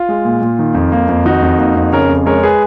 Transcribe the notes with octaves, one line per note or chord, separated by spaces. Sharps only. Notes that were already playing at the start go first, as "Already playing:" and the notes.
Already playing: F4
G#3
A#2
A#2
D#3
F2
A#3
F2
D#3 D#4 F#4
F2
A#3
F2
C#3 A#4 C#5
F2
G#3 A#4 C#5
G#4 B4